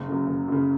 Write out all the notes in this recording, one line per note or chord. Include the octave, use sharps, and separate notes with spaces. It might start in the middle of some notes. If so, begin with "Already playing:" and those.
Already playing: F#1
F#2 C#3
F#1
F#2 C#3